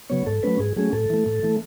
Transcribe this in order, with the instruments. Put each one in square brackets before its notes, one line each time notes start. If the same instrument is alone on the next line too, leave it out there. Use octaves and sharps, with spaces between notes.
[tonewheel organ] C#3 F#3 B3 C#5
G#2 A4
F#3 A3 C#4 B4
G#2 G#4
F#3 A3 C#4 G#4
A2 A4
E3 A3
A2
E3 A3